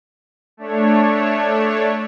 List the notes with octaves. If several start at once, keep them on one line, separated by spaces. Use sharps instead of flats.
A3 D4 C#5